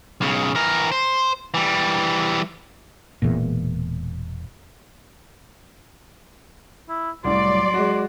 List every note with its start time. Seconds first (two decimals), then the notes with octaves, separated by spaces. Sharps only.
0.21 B1 C#3
0.55 E3 A#4
0.92 C5
1.54 E3 G3
3.22 E1 E2 A#2
6.89 E4
7.24 C2 A2 F#3 D5 C6
7.74 G#3 F#4